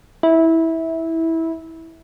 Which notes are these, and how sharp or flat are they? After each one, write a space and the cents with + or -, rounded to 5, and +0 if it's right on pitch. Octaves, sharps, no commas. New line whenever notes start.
E4 -15